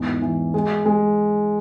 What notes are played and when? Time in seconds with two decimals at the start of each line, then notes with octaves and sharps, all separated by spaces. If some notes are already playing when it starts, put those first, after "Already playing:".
Already playing: E2 G#2
0.22 E3
0.54 G#3
0.86 G#3